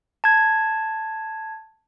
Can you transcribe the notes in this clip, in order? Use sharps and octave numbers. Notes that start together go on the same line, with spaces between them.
A5 G#6